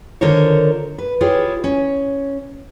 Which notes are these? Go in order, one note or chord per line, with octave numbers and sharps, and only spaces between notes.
D3 D#3 F4 A#4 C5 C#5
B4
E4 F4 G4 G#4 C#5
C#4